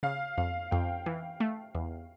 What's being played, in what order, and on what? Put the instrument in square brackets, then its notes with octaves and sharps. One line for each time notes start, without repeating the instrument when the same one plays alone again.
[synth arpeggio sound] C#3 [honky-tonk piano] F5
[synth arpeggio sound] F2 [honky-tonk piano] F5
[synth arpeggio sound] F2 [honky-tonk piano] G5
[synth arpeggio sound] E3
A3
E2